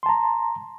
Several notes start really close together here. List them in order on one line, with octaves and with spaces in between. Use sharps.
C6 A5 A#5